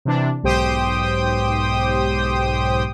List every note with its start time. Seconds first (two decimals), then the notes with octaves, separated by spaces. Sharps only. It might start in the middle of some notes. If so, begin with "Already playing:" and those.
0.05 C3 E3 D4
0.43 B1 G#2 G4 C5 G5 D#6